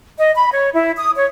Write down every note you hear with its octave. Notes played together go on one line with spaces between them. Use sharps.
D#5
B5
C#5
E4
D#6
C#5